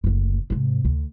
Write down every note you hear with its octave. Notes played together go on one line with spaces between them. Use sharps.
F#1 D2
G#2 C3
D2